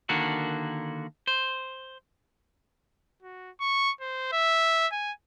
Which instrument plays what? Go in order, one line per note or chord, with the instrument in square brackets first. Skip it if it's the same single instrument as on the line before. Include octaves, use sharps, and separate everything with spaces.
[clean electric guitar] D3 D#3 A#3 D4 F#4
C5
[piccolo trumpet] F#4
C#6
C5
E5
G#5